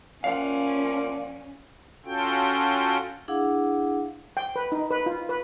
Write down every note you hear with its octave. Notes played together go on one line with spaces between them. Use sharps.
F3 A#3 C#4 D5 F5 F#5
C#4 F4 F#4 A4 G5
D4 E4 G#4 F5 F#5
G5
B4
D#4
B4
F4
B4